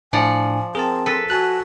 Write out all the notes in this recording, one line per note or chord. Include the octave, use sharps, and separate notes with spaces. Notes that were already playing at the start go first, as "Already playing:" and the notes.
A2 F3 D4 D5 F#5 G#5
C4 G#4 A#4 A5
A4 B4
F#4 G#5 A5 F#6